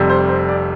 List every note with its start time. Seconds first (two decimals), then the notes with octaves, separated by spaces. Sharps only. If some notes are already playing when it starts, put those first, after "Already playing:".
Already playing: F1 F2 C3 G3
0.10 C5
0.29 C5
0.49 D5